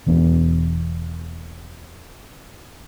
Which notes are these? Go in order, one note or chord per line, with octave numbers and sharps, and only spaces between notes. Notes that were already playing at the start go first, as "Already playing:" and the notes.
E1 E2 B3 D4